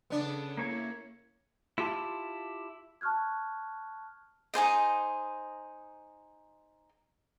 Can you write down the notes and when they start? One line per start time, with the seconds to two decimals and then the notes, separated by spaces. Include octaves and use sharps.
0.10 C#3 B3 C#4 D4 A4
0.57 A#3 C#4 E4 C#5
1.78 E4 F4 G4 A5
3.01 A5 C#6 F6 F#6 G#6
4.54 D#4 G#4 C5 D#5